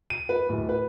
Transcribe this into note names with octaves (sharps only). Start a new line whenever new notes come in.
D#7
B4
D1
B4